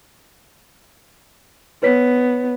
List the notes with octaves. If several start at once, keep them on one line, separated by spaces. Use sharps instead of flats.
B3 B4 C#5 B6